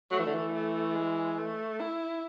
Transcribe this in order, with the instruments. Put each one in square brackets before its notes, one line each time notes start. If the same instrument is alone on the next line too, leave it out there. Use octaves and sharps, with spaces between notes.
[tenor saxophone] F#3 [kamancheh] A3
[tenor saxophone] E3
D3
E3
[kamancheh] A3
G#3
A3
E4